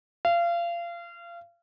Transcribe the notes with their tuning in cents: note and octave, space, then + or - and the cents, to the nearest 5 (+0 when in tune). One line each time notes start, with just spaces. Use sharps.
F5 -30